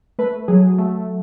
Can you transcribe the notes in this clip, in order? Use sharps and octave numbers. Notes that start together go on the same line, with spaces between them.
A3 B4
F#3 G#4
A3